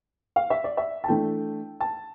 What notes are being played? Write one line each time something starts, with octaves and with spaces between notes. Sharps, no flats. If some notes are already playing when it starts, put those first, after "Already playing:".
F5
E5
D5
E5
A5
E3 A3 D4 G5
A5